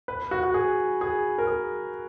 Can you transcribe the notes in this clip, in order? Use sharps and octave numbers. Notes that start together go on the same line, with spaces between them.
B4
F#4
F#4
G#4
G#4
A#4
G#4